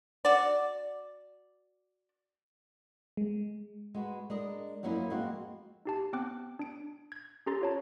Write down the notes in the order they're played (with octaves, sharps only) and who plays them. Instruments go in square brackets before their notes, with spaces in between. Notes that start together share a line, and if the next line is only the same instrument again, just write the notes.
[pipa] F#4 D5
[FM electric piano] G#3
[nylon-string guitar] G#3 F#4 B4
G#3 D4 A#4 D#5
F#2 F3 F#3 A#3 C#4 E4
F2 G#3 A#3 C4 F#4
[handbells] D#4 G4 A5
B3 C4 G5 D6 F#6
D4 D7
G#6
C#4 G4 A4 A#5 C6 A6
F4 C#5 A5 A#5